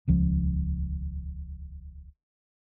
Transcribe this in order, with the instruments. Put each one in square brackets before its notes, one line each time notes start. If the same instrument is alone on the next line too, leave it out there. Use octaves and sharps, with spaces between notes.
[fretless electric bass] D#1 C#2 F3